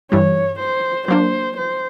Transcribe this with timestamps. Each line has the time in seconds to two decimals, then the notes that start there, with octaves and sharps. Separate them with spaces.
0.11 G2 E3 G3 C#5
0.59 C5
1.08 F#3 A#3 D4 C5
1.57 C5